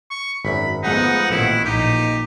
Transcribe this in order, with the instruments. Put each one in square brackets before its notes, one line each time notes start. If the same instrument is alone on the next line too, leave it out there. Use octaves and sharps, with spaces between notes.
[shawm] C#6
[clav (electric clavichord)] G#1 F#2 [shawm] B5
[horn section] F3 F#5 [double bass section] G#3 A3 B3 [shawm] D#4
[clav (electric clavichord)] A1 [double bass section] A#2 D#3 [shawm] E4
[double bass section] A#1 A#2 [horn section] D#4 [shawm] G4